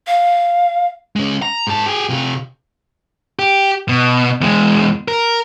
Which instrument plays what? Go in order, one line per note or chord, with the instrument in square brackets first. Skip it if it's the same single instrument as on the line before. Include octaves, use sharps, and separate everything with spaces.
[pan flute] F5
[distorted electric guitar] G#3 C#4
A#5
G#2 A5
G4 G#4
C3 F4
[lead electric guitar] G4
B2
E2 G#3
A#4